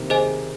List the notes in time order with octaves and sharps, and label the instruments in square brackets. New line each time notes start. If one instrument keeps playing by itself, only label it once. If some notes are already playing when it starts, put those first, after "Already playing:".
Already playing: [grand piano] C3 D#3 A#3
[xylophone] G#4 C5 D#5 G#5